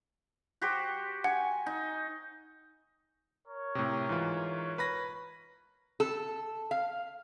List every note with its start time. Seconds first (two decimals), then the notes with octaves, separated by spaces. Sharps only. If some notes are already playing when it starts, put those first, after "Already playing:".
0.61 F#4 G4 C5
1.24 F#5 G#5
1.66 D#4
3.46 A#4 C#5
3.75 A2 C3
4.09 G#2 E3 F4
4.78 B4 B5 A#6
6.00 A4
6.71 F5